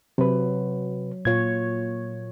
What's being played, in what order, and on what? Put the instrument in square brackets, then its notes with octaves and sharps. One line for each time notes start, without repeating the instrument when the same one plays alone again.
[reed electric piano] C3 B4 [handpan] F#3
[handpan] A#2 C#5 [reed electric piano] F4 G#6